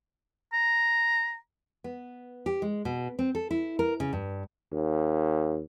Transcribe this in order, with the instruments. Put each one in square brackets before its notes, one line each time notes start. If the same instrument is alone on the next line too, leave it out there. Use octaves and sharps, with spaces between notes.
[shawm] A#5
[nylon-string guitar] B3
G4
G#3
B2
C4
A4
E4
A#4
C#3
G2
[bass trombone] D#2